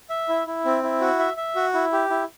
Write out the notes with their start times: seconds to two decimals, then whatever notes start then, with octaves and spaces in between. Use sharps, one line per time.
0.10 E5
0.29 E4
0.47 E4
0.65 C4
0.83 E4
1.00 F#4
1.19 E5
1.37 E5
1.56 F#4
1.74 E4
1.93 G4
2.10 E4